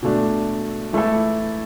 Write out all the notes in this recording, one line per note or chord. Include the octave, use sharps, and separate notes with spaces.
B2 A3 D4
E3 A3 E4 A4